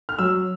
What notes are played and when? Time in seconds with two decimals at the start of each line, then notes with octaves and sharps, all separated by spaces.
0.09 F6
0.19 F#3 E6